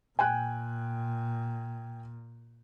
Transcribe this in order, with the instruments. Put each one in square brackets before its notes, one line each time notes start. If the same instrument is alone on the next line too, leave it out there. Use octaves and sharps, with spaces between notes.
[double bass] A#2 [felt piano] G5 G#5 F#6